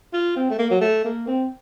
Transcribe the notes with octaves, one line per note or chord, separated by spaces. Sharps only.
F4
C4
A3
A#3
F#3
A3
A#3
C4